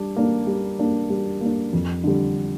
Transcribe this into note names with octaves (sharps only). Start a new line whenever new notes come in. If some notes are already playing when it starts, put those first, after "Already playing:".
Already playing: G3 D4
A#3 D4
G3
A#3 D4
G3
A#3 D4
F2
D3 G3